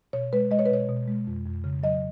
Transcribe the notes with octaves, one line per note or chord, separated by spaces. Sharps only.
B2 C#5
G#3 B4
G#3 D#5
C#5
B4
B2 C#5
B2
G#3
F2
F2
C#3
F#3 D#5